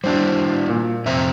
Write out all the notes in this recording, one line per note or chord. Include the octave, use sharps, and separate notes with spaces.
G3 D4 E4 F#4 C5
A#2
F2 C3 C5 E5 A#5